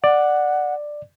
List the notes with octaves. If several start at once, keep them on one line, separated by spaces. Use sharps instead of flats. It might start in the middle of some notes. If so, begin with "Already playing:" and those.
D5 F#5